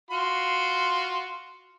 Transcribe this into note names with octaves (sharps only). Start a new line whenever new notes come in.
F4 F#4 C6